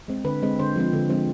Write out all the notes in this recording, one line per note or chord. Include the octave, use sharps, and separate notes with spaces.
G#3 C4
D3 B4
G#3 C4
D3 C5
F3 G#3 C4
D3
F3 G#3 C4